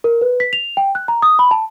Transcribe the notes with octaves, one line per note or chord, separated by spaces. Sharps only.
A#4
B4
B6
F7
G5
F#6
A#5
D#6
B5
A5